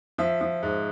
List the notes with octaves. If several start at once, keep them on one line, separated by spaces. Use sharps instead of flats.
F3 E5
F3
G#2